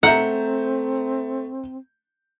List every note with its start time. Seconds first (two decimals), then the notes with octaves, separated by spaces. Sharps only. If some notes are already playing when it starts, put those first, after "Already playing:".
0.03 A3 C4 E5 F#5 A#5 G6